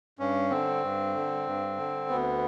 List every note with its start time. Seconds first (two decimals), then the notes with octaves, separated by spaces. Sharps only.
0.19 G2 C#4
0.50 D3 C4
0.83 G2
1.15 D3
1.47 G2
1.77 D3
2.09 D2 B3